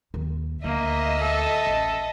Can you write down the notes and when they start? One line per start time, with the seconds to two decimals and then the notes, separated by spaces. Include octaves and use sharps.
0.14 D#2
0.64 D2 A#3 D#5 E5
1.19 A4
1.67 A1